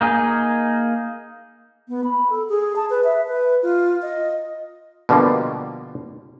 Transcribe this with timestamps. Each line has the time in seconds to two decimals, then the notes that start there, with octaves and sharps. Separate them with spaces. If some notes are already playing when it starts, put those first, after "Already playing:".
0.01 A#3 D#4 G#4
1.89 B3
2.04 B5
2.30 A4
2.49 G#4
2.76 A5
2.90 B4
3.04 E5
3.28 B4
3.63 F4
4.02 D#5
5.09 B2 D3 F3 G3 A#3